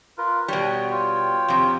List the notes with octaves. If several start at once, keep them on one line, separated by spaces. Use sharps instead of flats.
F4 A#4 B4
B2 G3 C#5
F4 C#5 G5
F2 C3